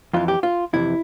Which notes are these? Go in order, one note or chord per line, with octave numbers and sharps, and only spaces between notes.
F2 E3 F4
G4
F4
F2 C3 E3 E4